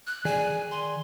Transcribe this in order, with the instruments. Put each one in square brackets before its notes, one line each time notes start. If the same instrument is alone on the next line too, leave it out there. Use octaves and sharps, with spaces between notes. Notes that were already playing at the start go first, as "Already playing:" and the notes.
[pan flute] F#6
[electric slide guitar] D#3 G#4 D5 [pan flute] G#5
[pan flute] C6